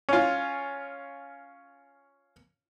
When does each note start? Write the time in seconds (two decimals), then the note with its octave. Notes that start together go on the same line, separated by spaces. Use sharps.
0.09 C#4 F4